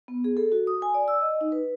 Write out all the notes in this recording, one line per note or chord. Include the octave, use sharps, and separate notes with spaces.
B3
G#4
A4
F#4
D#6
G#5
D5
E6
D#5
D#4
B4